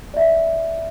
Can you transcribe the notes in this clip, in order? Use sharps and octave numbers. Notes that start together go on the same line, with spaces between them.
D5 E5